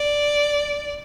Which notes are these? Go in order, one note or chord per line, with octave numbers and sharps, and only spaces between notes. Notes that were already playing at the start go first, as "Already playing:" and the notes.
Already playing: D5